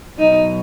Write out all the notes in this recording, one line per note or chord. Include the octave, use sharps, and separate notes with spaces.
B2 F#3 D#4